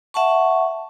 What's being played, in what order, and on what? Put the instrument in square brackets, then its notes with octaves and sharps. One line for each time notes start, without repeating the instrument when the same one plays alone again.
[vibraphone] E5 F#5 A5 C#6